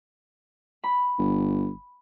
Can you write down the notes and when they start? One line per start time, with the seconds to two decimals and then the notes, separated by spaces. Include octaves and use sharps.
0.84 B5
1.19 G1